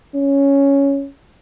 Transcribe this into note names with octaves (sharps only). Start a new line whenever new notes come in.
C#4